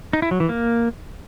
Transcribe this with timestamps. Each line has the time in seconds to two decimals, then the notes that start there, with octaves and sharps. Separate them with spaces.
0.13 D#4
0.22 E4
0.31 F#3
0.40 E3
0.49 A#3